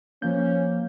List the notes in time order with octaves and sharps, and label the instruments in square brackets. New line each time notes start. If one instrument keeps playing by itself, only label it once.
[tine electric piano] F3 G6 [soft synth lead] A#3 [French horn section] C#4